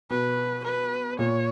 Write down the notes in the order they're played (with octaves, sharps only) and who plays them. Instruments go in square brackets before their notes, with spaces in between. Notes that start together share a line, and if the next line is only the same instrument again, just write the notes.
[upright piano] B2 [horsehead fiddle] B4
[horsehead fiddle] B4
[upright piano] A#2 [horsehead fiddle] C#5